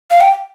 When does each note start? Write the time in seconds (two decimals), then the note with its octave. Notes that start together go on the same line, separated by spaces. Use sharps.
0.11 F5
0.20 G5